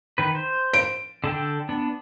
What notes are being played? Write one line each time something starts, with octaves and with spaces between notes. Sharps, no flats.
D#3 B4
C5
D7
D3 A4 G5
B3 D4